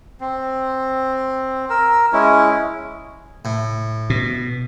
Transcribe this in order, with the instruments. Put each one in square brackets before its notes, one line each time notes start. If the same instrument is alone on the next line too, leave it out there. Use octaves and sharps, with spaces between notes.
[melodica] C4
A#4 E6
G#3 C#4 E4
[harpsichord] A2
[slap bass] B2